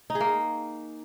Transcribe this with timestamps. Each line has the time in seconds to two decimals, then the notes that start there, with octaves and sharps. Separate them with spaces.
0.10 D#4
0.15 G#4
0.20 A#3